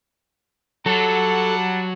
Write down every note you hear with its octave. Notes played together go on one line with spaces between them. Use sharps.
F#3 G3 A4 F#5 A5